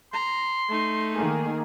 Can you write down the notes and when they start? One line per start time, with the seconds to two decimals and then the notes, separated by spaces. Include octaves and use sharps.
0.13 A#5 C6
0.68 A3 D#4
1.14 D#3 A#3 G#4